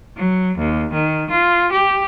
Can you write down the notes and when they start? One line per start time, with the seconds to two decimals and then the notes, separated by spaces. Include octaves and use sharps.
0.17 F#3
0.58 D#2
0.93 D#3
1.30 F4
1.72 G4